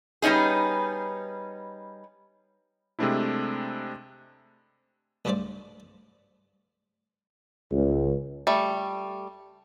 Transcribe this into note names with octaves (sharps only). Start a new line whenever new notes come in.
G3 B3 C#4 D#4 G#4
C3 G#3 A3 C4 D4 E4
B1 G2 C#3 A3 C5 D5
C#2
G3 A3